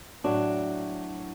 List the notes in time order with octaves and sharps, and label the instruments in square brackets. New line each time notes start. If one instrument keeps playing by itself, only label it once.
[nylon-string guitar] A2 F#3 A3 D4 F#4